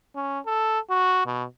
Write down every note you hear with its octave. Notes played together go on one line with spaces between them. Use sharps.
C#4
A4
F#4
B2